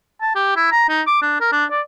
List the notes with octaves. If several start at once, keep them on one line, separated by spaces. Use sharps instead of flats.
A5
G4
E4
A#5
D#4
D6
D4
A#4
D4
D5